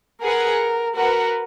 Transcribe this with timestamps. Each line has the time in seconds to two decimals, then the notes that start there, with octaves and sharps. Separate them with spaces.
0.22 G#4 A#4 B4 F#5
0.96 F#4 A#4 B4 F#5